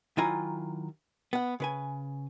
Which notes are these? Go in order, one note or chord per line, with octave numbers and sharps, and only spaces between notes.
D#3 F#3 E4 F4 G#5 A#5
B3 F#5
C#3 B4 G#5